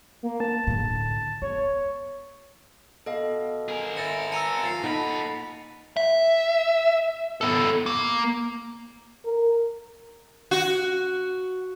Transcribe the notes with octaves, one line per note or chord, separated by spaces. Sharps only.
A#3
A5
A2 D3
B3 C#5
B2 A4 D#5 F5
G#4 A#4
B4 E5 A6 A#6 C#7
A5 A#5 E6 C#7 D#7 F7
F3 A6 C7
A#2 D#4 A4 D#5 F#5 A5 B5 D7
E5
B3 A4
A#3
A#4
F#4